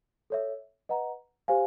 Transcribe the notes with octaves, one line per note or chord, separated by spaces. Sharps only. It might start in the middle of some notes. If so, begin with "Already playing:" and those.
A4 C#5 E5
B4 D#5 F#5 A#5
G4 C5 F5 G#5